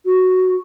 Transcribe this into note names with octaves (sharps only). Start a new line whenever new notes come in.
F#4